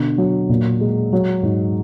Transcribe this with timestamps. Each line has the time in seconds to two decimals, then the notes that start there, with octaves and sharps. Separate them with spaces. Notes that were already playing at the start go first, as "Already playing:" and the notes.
Already playing: B2 D3
0.18 F#3
0.49 A#2
0.81 G#3
1.13 F#3
1.43 G#2